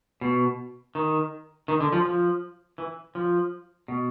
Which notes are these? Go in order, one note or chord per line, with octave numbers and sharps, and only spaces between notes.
B2
D#3
D#3
D3
F3
F3
E3
F3
B2